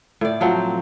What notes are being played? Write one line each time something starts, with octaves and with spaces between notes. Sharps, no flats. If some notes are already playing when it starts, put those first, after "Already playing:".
A2 D5
F3 F#3 C4